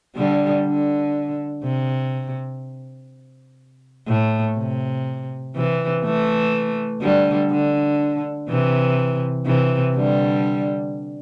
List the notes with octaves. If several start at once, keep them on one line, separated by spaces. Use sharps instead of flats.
D3 G3
D3
C3
A2
C3
C3 E3
E3 A3
D3 G3
D3
C3 E3
C3 E3
D3 G3